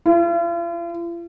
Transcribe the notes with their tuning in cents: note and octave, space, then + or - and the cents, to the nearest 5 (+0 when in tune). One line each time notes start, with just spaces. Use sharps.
F4 -45